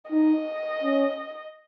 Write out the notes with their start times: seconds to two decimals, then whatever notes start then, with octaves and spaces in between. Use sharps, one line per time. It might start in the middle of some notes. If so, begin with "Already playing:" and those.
0.10 D#4 D#5
0.84 C#4